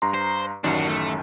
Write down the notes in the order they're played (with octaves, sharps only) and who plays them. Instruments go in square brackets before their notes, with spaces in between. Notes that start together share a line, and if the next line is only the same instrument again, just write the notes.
[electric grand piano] G2 A#5 C6
[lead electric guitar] C5
[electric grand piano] A1 F#2 D#3 [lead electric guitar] D4 F#4
[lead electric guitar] A3